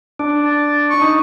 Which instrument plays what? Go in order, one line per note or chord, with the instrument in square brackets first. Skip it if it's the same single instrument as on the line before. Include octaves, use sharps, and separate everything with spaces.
[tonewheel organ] D4
[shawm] A5
C#6
[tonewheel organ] D#4